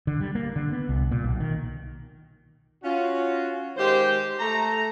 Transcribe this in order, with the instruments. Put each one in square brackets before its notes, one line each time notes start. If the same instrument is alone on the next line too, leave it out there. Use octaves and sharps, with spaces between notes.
[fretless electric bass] D3
G3
A#3
D3
B3
C2
A#2
B1
D#3
[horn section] C#4 F4 F#4
D#3 G#3 G4 C5
A3 A#5